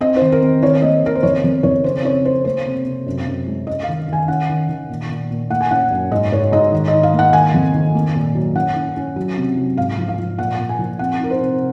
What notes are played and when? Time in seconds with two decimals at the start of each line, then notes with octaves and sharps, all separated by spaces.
0.01 C4 D#5
0.16 C5
0.21 D#3
0.32 A#4
0.41 C4
0.63 D#3 C#5
0.82 A#3 D#5
1.03 D#3 A#4
1.15 C5
1.23 F2 C#5
1.44 F2
1.63 F2 C#5
1.84 C#3 C5
2.05 C#3 C#5
2.25 C#3 C5
2.45 A#3 C5
2.66 C3
2.87 C3
3.06 F#2
3.26 F#2
3.47 G#3
3.67 C#4 D#5
3.83 F5
3.88 D#3
4.08 D#3 G#5
4.28 C#4 F#5
4.49 D#3
4.69 D#3
4.89 A#2
5.10 A#2
5.31 A#2
5.50 A#3 F#5
5.61 G#5
5.71 C#4 F#5
5.91 F#2
6.11 G#2 D#5
6.32 G#2 C#5
6.52 G#2 D#5
6.72 D#3
6.88 D#5
6.93 D#4
7.03 F5
7.14 A#3 F#5
7.33 D#3 G#5
7.54 F2
7.74 D#3
7.95 A#3
8.16 A#2
8.35 F#3
8.55 C#4 F#5
8.76 C#4
8.97 C#4
9.16 F#3
9.37 C3
9.57 F#3
9.77 G#2 F5
9.98 F3
10.08 F5
10.18 F3
10.38 A#2 F#5
10.59 A#2
10.69 G#5
10.79 F3
10.99 C4 F#5
11.20 D#4 A#4
11.31 C5
11.40 C3